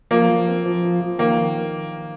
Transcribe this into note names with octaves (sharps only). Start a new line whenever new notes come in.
F3 A#3
F3
C4
F3
F3
F3
D#3 A#3
D#3